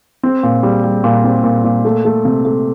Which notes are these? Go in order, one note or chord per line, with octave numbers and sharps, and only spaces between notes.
C4
A#2
G3
G3
A#2
C4
A#2
A#2
A3
A3
C3
A3